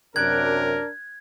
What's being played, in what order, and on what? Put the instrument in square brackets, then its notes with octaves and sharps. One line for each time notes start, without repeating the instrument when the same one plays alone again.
[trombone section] F#2 C3 [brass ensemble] D4 A#4 [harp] F#6 D7 [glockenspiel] G#6